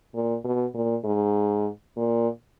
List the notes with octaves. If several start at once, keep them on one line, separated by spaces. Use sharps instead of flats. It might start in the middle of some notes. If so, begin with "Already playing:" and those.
A#2
B2
A#2
G#2
A#2